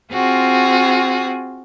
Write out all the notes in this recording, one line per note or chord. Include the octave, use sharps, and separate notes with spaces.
C4 F4 F#4 G#4